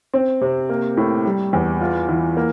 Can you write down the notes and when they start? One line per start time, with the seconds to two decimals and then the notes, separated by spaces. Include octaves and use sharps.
0.14 C4
0.41 C3
0.69 A#3
0.97 A2
1.25 G3
1.53 E2
1.81 F4
2.09 E3
2.37 A#3